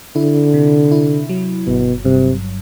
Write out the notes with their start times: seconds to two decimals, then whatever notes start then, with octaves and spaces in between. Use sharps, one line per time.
0.15 D3 E4
0.54 C3
0.91 E4
1.29 F#3
1.66 G1 B2
2.05 G2 C3